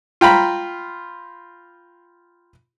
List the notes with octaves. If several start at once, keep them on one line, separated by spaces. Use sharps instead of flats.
F4 G5 A#5 B5